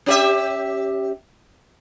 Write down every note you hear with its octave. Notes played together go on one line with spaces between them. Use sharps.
C#4 G4 E5